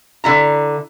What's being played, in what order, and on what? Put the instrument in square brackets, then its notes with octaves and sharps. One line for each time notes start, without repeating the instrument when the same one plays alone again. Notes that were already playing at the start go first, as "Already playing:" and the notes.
[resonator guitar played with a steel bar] D3 E4 A#5